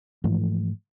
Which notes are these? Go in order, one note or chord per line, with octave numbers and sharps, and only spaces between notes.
G#2 E3 F3 A3